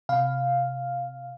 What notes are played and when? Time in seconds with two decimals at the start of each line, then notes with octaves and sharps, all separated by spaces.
0.09 C3 F5